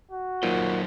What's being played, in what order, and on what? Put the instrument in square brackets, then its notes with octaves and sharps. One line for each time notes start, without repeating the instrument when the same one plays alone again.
[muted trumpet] F#4
[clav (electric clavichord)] A#2 [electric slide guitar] F#3 D#4 C5